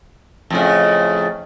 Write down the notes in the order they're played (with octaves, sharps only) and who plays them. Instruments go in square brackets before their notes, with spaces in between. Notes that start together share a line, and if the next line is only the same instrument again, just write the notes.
[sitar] F2 A2 C#3